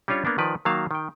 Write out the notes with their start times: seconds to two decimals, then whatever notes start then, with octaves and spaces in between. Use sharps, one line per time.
0.08 G3 C#4 D4 F4 C#5
0.25 A#3 B3 D4
0.38 D#3 F3 B4 D5
0.65 D#3 F#3 A#3 F5 A5
0.91 D#3 G5